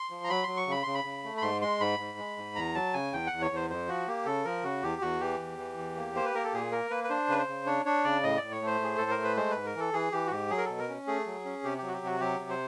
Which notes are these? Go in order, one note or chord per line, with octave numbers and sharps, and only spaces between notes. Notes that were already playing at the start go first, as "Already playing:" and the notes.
Already playing: C6
F3
A#5
F#3 B5
F#3 C6
C#6
C#3 B5
C#3 C6
B5
C#3
A3
B5
G#2 C6
G#3 C6
G#2 B5
G#2
G#3
G#2
E2 A#5
F#3 A5
C#3 G#5
E2 G5
E2 F#5
C#5
E2 C5
F2 C5
F3 F#4
A#3 G4
C#3 A4
F3 A#4
C#3 F#4
E2 G4
E2 F#4
E3 G4
E2
E3
E2
A#3
A#3 C5
B4
A#3 A#4
A4
A#2 G#4
A#3 A#4
A#3 B4
B4
D4 C5
C#3 B4
C5
C#3
D4 C#5
D4 C#5
C#3 D5
A2 D#5
D5
A2
C#5
A3
C5
A2 G#4
A2 A4
A#4
A3
B4
G#3 C5
G#2 B4
A#4
E3 A4
E3 G#4
E3 G4
F#4
G#2 G4
F#3 G#4
A#4
B2 A4
A#4
C#4
A3 G#4
F#3
C#4
C3 G4
F#3 G4
F#4
G4
C3 F#4
F#3 G4
C3
C5